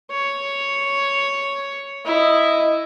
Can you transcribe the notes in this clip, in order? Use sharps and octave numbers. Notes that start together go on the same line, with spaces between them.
C#5
E4 D#5